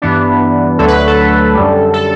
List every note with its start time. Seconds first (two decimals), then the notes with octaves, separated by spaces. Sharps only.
0.02 G2 E3 B3 D4
0.79 D2 D3 F#3 A3 A4
0.88 B4
1.07 A4
1.55 F#2 D3 G3
1.94 A4